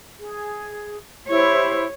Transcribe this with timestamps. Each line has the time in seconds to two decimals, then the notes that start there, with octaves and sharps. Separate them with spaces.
0.21 G#4
1.28 E4 G4 C5 C#5